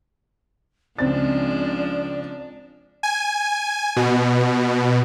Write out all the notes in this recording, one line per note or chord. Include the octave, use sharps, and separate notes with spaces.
C#2 F3 G#3 C4 D4 D5 A6
G#5
B2